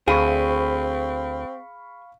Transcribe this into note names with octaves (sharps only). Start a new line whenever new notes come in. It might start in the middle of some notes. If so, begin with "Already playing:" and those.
D2 C4 G#4 F5 B5 C#6